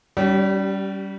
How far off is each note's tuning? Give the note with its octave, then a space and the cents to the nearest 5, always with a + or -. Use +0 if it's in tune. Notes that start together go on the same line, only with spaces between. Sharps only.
G3 -10 C#4 +20 G4 -40